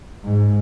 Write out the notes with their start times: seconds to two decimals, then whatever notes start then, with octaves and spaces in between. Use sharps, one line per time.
0.23 G#2